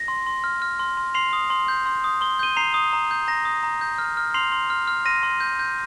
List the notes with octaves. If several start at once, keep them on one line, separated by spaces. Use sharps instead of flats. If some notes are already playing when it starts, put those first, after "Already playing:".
Already playing: A#6
C6
C6
F6
F6
C6
C6
C6 C7 F7
D#6
C6
G6
C6
D#6
C6 G7
G6 D#7 G7
A#5 C7 F7
D#6
A#5
G6
A#5 A#6
D#6
A#5
G6
F6
F6
C6 C7 F7
C6
F6
F6
C6 A#6 D#7
C6
G6
G6